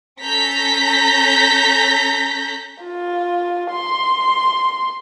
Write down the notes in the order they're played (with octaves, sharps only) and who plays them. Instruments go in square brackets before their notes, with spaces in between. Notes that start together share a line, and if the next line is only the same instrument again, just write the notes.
[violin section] C#4 A4 A#5 G6 A#6 B6
[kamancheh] F4
C6